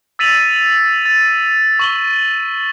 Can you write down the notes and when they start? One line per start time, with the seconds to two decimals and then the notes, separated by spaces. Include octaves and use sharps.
0.19 E6 A6 B6 D#7 F7 F#7
1.05 A6
1.79 C#6 F#7 G7